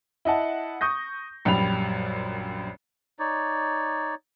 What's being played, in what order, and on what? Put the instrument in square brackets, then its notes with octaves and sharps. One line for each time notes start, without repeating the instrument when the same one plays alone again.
[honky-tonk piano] E4 D#5 F#5 A5
C#6 D#6 G6 A#6
A#1 F#2 G3 B5 F7
[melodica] D#4 C#5 D5